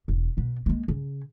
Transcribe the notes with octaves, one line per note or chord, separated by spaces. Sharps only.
E1
B2 B3
G#3 A#3
C#3